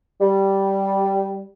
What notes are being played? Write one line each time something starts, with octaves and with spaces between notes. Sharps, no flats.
G3